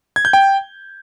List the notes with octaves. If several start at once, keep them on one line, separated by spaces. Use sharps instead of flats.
G#6
G6
G5